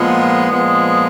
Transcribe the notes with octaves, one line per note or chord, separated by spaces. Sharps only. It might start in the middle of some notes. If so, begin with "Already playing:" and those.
Already playing: A#2 F3 G#3 B3
A#2 F3 G#3 B3